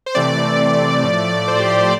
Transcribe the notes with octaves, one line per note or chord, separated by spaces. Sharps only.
C5
C3 E3 A3 C4 D5
A2 F3 A3
C5
G4
G4
C5